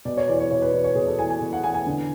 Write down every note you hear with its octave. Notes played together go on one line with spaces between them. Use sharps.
B2 D5
C#5
E2 D5
C#5
B2 C#5
B4
E2 D5
C#5
B2 G#4
A4
E2 G#5
G#5
B2
F#5
E2 G#5
G#5
D3